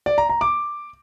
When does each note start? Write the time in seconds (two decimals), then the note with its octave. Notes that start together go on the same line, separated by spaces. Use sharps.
0.06 D5
0.18 A#5
0.29 A#5
0.41 D6